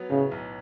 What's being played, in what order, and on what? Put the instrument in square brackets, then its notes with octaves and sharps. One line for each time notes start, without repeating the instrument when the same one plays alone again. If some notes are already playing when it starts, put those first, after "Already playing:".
Already playing: [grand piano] F#3 B3
[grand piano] A2 [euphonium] C#3
[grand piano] B1